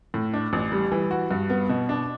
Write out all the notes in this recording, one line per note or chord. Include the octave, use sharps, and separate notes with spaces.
A2
D4
A1
G3
E3
F#4
G2
B3
B2
D4